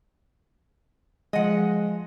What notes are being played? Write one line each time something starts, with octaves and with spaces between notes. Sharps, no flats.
F3 G#3 D#5 F#5